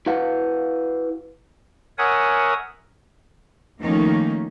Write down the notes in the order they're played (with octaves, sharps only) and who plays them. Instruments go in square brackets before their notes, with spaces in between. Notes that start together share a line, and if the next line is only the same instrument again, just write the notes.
[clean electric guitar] E4 F#4 B4 F5 F#5
[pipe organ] A#4 C#5 E5 F#5 G#5 D#6
[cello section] D#3 F3 A3 A#3 C#4 D#4